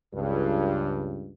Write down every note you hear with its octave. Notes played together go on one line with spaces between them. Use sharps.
C#2 G2